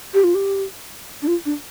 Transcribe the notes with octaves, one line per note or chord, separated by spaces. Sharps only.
G4
F4
G4
D4
F4
D4